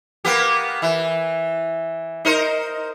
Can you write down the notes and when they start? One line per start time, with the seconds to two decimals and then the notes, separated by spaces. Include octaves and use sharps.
0.25 A#3 B3 G4
0.82 E3
2.25 D#4 A#4 C5